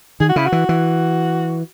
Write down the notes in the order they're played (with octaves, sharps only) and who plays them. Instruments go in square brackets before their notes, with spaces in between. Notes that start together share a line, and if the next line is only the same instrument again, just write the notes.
[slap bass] D#3 [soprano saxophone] G#4
[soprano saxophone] F#4
[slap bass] C#3 [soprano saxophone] E4
[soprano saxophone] F#4
[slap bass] E3
E3